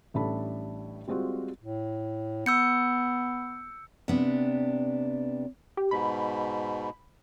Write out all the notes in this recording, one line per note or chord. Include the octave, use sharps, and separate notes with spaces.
A1 A2 G3 D4 A4 B5
G3 G#3 C4 F4 F#4
A2
B3 E6 G6 C#7
C3 B3 D4
G4
G#2 B2 B5